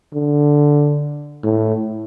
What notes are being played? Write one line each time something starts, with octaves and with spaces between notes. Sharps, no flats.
D3
A2